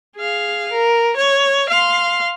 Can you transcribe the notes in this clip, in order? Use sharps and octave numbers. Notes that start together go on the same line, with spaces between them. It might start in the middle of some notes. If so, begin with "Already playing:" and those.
G#4 F5
A#4
C#5
F5 C6